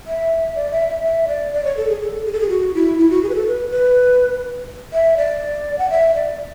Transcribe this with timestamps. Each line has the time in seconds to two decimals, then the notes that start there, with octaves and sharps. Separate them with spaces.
0.07 E5
0.55 D5
0.71 E5
0.88 E5
1.03 E5
1.28 D5
1.53 D5
1.65 C#5
1.77 A4
1.89 G#4
2.01 A4
2.25 G#4
2.33 A4
2.40 G#4
2.49 F#4
2.74 E4
2.99 E4
3.10 F#4
3.23 G#4
3.29 B4
3.35 A4
3.47 B4
3.71 B4
4.93 E5
5.17 D5
5.78 F#5
5.90 E5
6.15 D5